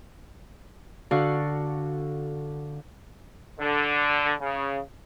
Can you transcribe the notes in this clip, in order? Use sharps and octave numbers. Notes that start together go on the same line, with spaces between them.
D3 D4 F#4 A4 F5 C#6
D3
C#3